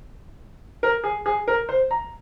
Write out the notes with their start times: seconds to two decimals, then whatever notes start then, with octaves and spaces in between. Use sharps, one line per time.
0.83 A#4
1.04 G#4
1.26 G#4
1.48 A#4
1.69 C5
1.91 A#5